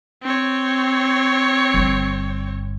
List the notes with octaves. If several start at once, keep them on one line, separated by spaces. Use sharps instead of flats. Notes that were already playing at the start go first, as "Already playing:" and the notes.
C4 C#5
G1